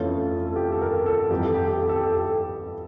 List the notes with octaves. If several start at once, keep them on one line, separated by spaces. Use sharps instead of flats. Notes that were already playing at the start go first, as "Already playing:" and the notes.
Already playing: F2 E3 A3 C#4 F4
A4
G4
A4
A#4
A4
F2 E3 G3 G4
A4
G4
A4
G4
A4
G4
A4
G4